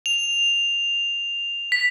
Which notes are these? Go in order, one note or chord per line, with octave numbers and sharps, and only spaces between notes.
F7
B6